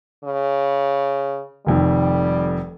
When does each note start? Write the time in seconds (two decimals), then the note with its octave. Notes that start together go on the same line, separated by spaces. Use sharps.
0.24 C#3
1.66 F1 F2 D#3 G3